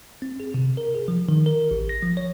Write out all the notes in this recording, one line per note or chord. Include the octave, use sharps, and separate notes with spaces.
C4
G#4
C3
A#4
G#4
F3
D#3
A#4
A1
A#6
F3
C#5